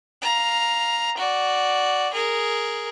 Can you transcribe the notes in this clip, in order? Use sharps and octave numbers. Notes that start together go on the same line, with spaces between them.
F5 A#5
F#4 D5
G#4 A#4